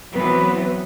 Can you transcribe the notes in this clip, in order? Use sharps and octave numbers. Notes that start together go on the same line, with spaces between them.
E3 F#3 B3 C4 B4